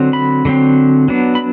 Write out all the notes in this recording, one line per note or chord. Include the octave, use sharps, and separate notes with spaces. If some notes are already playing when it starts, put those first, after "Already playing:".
Already playing: D3 F#3 C4
B5
D3 F#3 C4
F#3 B3 D4
B5